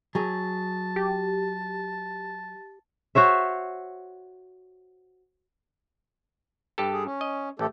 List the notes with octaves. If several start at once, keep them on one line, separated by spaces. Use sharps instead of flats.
F#3 G#4 A5
G4
F#4 C5 C#5 E5
G2 G4 A4
G#4
C#4
D#5
A1 A3 G4 A4